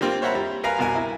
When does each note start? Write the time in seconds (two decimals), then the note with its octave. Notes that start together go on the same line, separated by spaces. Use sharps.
0.01 G3 A#3 C4 F4
0.22 C5 C#5 E5 F#5 A#5 B5
0.35 G3
0.63 A#4 B4 F5 G#5 A#5
0.78 C2 B2 A#4 G#5
0.95 E4